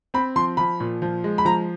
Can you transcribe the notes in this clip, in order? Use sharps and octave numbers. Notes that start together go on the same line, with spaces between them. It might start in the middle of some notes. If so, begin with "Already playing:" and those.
C4 B5
F3 C6
F3 B5
A#2
F3
G#3
B5
F3 A#5